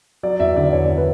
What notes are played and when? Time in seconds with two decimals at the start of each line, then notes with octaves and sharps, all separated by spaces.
0.23 F#3 D5
0.40 E2 E5
0.56 D3 D5
0.73 E2 C#5
0.98 B4